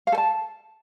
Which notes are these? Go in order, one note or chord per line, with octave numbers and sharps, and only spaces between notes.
F5
A4
A5